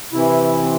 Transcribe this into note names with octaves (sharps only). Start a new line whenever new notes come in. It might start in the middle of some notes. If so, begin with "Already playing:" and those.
C3 E3 E4
C4